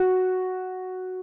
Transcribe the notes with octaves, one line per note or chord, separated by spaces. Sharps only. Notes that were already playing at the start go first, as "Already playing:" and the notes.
Already playing: F#4